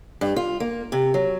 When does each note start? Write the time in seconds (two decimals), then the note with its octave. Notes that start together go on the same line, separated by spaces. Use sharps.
0.21 G2
0.36 F4
0.60 A#3
0.92 C3
1.14 F#3